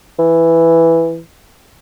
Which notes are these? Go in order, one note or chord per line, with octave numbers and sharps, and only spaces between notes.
E3